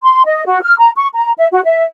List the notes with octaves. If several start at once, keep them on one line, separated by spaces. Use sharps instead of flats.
C6
D#5
F#4
F6
A#5
C#6
A#5
E5
F#4
E5